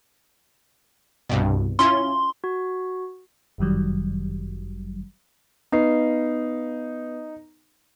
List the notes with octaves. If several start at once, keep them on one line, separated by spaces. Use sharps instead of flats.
C2 G2 B2
C#4 E4 F4 C6
F#4
G1 F#2 D#3 F#3 G3
B3 D#4 B4 C7